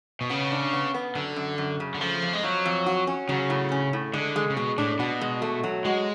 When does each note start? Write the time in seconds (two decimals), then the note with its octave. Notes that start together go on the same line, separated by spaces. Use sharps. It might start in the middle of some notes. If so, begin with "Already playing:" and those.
0.21 B2
0.30 C#3 B3
0.52 D4
0.73 B3
0.94 B3
1.15 F#2 D3
1.36 F#2
1.58 F#2
1.80 C#3
1.95 D3
2.01 F3 A3
2.22 F2
2.33 G#3
2.43 F3 F#3
2.66 F2
2.86 F#4
3.07 C#4
3.29 C#3 F#3
3.50 A2
3.72 C#4
3.93 A2
4.14 D3 G#3
4.36 G#3
4.50 C#3
4.56 B2 G#3
4.78 A2 D4
4.99 B2 F#4
5.21 G#3
5.42 A3
5.64 F#3
5.85 G#3 F#4